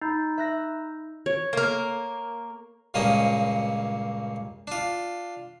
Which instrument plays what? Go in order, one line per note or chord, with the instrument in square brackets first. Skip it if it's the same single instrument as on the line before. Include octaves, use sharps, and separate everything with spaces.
[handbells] D#4 [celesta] A#5 B5 G6
[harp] E5 F#6 A#6
[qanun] C#5
[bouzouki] A#3 A#4
[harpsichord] C#2 G2 A#2 A#3 C#4 D#5
D4 F4